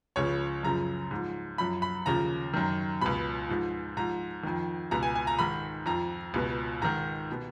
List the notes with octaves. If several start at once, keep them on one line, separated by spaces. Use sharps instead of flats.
C#2 C#3 F3 C#5
F#2 C#3 F3 A#5
G#2 F3
F#2 F3 B5
B5
D#2 C#3 F3 A#5
F#2 D#3
C#2 B2 B5
G#2 F3
G#2 F3 A#5
F2 D#3
C#2 B2 A#5
G#5
G#5
A#5
G#2 D#3 B5
F2 F3 A#5
C#2 B2
G#2 D#3 A#5
B2